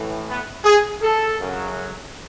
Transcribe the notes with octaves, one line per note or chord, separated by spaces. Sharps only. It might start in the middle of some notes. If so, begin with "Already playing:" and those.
Already playing: A2 E3
B3
G#4
A4
F#2 C#3 F#3